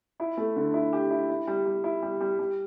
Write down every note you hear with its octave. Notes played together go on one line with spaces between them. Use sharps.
E4
A3
D3
E4
G4
E4
E4
G3
G3
E4
G3
G3
G3